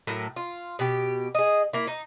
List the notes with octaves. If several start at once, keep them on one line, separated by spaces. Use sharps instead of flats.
A2 F#3 A#3
F4
B2 G4
G#4 D#5
A#3 E4
D#4